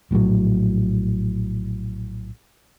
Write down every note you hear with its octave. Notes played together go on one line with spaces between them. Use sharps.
A#1 A2 D3 F#3